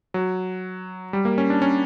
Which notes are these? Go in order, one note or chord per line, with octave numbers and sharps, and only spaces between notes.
F#3
G3
A#3
C#4
D4
C#4